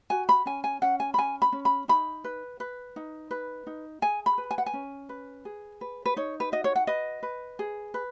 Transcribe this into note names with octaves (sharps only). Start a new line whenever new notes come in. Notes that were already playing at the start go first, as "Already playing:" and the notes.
F#4 G#5
B5
C#4 G#5
G#5
C#4 F#5
G#5
B5
C#4 G#5
B5
C#4
B5
D#4 B5
B4
B4
D#4
B4
D#4
G#4 G#5
B5
B4
G#5
F#5
G#5
C#4
B4
G#4
B4
B4
D#4 C#5
B4
F#4 D#5
C#5
F#5
B4 D#5
B4
G#4
B4